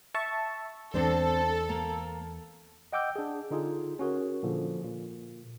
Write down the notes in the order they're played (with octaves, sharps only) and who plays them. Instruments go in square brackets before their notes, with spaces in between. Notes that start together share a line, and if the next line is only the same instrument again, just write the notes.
[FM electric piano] E5 A5 C#6
[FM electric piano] E2 [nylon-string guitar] C4 D4 C5 [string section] A4
[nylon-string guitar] A#3
[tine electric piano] D#5 F#5 G5 D6 E6 G6
D4 G#4
D3 D#4 F4 G#4
C#4 F#4 G#4 A#4
A#2 D3 F3
A#2